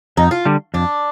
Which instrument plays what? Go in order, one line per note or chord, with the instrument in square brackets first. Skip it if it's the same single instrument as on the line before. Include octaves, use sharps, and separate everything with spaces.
[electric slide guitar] F2 [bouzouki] D#4
[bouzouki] F4
[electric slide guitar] D3 G3
[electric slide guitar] F2 [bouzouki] D4